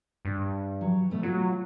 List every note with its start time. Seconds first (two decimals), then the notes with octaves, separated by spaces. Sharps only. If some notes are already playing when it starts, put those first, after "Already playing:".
0.25 G2
0.81 F#3
1.10 B2 A3 B3
1.23 F#3 F4